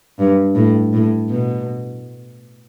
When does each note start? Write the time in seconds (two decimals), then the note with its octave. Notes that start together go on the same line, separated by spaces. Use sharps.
0.19 G2
0.55 A2
0.93 A2
1.29 B2